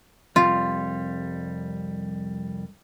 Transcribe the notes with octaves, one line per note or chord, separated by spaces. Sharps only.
C2 F2 G3 F4